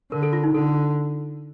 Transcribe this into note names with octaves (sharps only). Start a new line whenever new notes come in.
D3 A#4
A4
F4
D#4
D3 A4